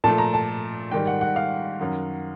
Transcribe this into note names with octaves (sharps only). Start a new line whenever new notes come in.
A#2 F3 A3 A5
A#5
A5
G#2 D#3 G3 G5
F#5
F#5
F5
F#2 D#3 F#3